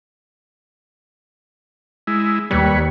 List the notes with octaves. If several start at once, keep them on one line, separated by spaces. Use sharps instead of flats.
G#3 E4
D#2 G3 B4 C#5